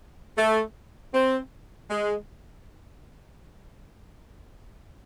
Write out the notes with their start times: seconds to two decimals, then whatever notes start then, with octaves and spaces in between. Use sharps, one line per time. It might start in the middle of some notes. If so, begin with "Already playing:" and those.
0.37 A3
1.14 C4
1.90 G#3